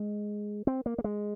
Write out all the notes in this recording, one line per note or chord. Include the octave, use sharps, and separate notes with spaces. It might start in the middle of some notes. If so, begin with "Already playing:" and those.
Already playing: G#3
C4
A#3
A#3
G#3